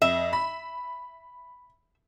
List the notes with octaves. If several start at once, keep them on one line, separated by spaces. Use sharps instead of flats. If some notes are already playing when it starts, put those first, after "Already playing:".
F2 E5
B5